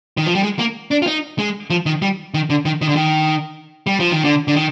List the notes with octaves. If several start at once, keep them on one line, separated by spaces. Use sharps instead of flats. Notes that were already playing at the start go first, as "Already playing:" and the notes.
D#3
F3
G3
G#3
A#3
D4
F4
D#4
G#3
F3
D#3
G3
D#3
D3
D#3
D#3
D3
D#3
G3
F3
D#3
D3
D3
D#3